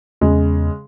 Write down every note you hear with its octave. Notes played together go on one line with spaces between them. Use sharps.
E2 C#3 G#3